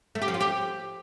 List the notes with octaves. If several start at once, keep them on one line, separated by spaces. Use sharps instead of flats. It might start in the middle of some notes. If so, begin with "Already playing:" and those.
A3
G4
F3
F4
G4